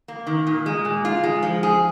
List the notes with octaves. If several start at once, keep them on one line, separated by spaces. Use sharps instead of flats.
A#3
D#3
A#2
G#3
A#2
F4
G#3
F3
G#4